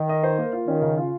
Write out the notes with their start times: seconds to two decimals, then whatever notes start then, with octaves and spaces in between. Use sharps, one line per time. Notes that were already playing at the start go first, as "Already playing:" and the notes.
Already playing: D#3
0.09 D#5
0.24 C5
0.38 A#3
0.53 F4
0.67 D#3 C#4
0.82 C#3
0.98 F4